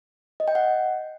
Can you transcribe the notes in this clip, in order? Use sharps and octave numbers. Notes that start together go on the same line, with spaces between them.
D#5
G5
F#5